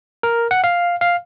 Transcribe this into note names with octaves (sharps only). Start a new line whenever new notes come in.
A#4
F#5
F5
F5